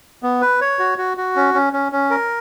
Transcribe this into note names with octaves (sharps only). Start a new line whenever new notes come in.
B3
B4
C#5
F#4
F#4
F#4
C#4
C#4
C#4
C#4
A#4